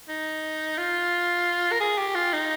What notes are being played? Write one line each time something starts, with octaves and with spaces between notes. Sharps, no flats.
D#4
F4
A#4
G#4
G4
F4
D#4